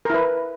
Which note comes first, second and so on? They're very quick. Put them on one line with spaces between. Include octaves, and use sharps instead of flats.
A#4 E4 B4